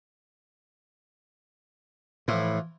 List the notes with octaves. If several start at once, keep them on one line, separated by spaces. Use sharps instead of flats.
A2 E3 F3 E4